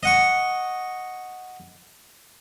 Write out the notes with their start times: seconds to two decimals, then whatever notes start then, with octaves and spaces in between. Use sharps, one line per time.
0.03 D#5 F#5 C#6